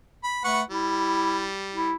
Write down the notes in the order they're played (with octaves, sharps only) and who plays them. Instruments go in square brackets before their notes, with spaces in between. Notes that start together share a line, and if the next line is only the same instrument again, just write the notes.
[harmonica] B5
[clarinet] A3 [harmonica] B4 F#5 C#6
[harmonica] G3 [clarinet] E4
[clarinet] E4